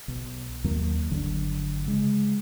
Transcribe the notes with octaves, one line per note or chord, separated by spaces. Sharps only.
B1
D#2 F#3 A#3
G1 D3 F#3
C#3 G#3